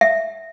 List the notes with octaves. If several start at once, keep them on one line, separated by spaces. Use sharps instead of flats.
E5